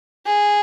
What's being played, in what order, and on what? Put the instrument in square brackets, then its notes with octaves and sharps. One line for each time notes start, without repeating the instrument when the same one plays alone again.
[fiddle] G#4